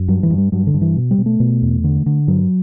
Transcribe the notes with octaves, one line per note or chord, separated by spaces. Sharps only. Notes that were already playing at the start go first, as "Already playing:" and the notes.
Already playing: F#2
G2 F#3
E3
G2
G3
G2 F#3
D3
G2
E3
B2
G3
B2
A3
B2
E2
D3
D3
G2 F#3